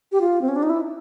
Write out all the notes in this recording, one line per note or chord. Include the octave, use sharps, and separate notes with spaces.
G4
F4
C4
C#4
D4
D#4
E4